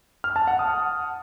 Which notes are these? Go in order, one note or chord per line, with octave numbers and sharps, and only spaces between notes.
F6
A5
F#5
D#6